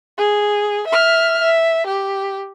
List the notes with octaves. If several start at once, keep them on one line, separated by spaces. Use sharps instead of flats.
G#4
E5 F6
E5
G4